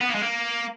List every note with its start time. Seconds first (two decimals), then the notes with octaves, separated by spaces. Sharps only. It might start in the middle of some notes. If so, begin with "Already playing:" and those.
0.01 B3
0.09 A#3
0.15 G#3
0.22 A#3